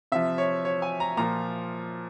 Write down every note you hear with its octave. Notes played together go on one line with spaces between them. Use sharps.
C3 F3 E5
C#5
C#5
G#5
A#5
A#2 F3 A#5